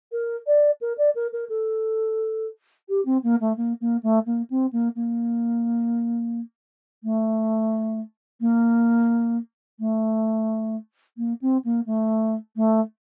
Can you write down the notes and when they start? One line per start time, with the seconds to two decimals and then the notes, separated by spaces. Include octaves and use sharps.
0.12 A#4
0.47 D5
0.81 A#4
0.98 D5
1.15 A#4
1.33 A#4
1.50 A4
2.89 G4
3.06 C4
3.23 A#3
3.41 A3
3.57 A#3
3.81 A#3
4.03 A3
4.26 A#3
4.50 C4
4.73 A#3
4.96 A#3
7.04 A3
8.41 A#3
9.79 A3
11.17 A#3
11.42 C4
11.65 A#3
11.86 A3
12.56 A3